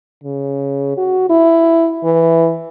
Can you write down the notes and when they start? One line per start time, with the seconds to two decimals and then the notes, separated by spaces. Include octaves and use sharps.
0.24 C#3
0.97 F#4
1.30 E4
2.04 E3